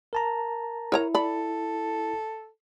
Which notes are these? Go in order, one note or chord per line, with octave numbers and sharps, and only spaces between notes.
A#4 A5 A#5
E4 A#4 C#5 A#5
A4 D5 B5